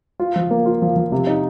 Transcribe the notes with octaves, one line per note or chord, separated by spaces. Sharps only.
F4
F3
A#3
F4
F3
F3
C3
D#4